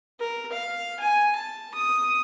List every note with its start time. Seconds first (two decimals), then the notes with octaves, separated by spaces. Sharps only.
0.20 A#4
0.53 F5
1.00 G#5
1.36 A5
1.74 D#6